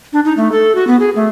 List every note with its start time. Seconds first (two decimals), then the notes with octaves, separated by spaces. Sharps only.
0.13 D4
0.25 D#4
0.37 A3
0.52 A4
0.75 F#4
0.87 B3
1.00 G#4
1.16 A3